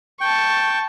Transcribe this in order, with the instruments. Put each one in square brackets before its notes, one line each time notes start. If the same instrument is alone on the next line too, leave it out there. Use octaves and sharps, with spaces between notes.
[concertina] G5 [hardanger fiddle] A5 C#6